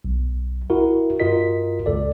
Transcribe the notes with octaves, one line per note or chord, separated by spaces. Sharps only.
B1
E4 F#4 A#4
G2 F4 F#4 A#4 D#5 B6
C#2 A4 D5